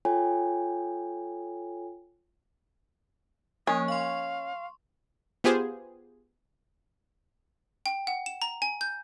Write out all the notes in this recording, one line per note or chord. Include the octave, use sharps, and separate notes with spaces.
F4 A4 C#5 G5 G#5
F3 A#3 C#4 D#6
F5 C6 C#6
B3 F4 G4 G#4 C5
G5
F#5
E7
A#5
G#5
G6